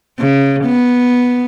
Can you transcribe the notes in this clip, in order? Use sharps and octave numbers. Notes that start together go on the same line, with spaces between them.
C#3
B3